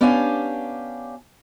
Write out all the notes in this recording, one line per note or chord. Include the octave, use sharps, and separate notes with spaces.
B3 C#4 D4 G4 F5 G#5